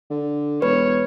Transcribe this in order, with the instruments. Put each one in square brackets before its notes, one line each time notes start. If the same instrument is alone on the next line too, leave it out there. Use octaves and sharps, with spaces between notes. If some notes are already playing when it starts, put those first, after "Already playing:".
[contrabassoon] D3
[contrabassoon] E1 [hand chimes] B4 [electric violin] C#5